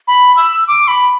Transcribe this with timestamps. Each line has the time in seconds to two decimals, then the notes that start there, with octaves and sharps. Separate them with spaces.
0.08 B5
0.37 E6
0.68 D6
0.88 B5